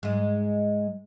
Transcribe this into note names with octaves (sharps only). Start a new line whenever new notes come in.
G#2 G#3